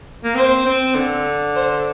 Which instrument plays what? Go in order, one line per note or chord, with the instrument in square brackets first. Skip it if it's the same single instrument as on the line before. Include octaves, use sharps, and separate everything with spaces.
[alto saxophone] A#3
[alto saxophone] C4 [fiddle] C5
[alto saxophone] C4
D3
[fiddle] C5